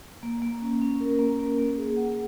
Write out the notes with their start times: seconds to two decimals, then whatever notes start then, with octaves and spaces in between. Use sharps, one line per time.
0.23 A#3
0.42 A#3
0.62 C#4
0.82 C#4
1.00 A#4
1.19 A#3
1.39 A#3
1.58 A#3
1.78 G#4
1.97 F#5